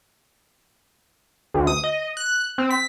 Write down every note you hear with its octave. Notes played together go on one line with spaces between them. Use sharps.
D2
D#6
D#5
F#6
C4
B6